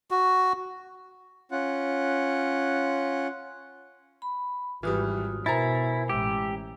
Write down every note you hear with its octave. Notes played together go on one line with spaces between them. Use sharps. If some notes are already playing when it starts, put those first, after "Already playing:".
F#4
C#4 F4 F#5
B5
G#1 E3 G3 F4 F#4 D#6
B2 E4 A#4 C5 G#5 A#5 A6
A1 G#3 G4 E6